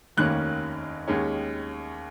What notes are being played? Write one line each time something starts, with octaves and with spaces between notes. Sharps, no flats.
F1 D#2 D#3 A#3 C#4 F#6
D#2 D#3 G#3 C#4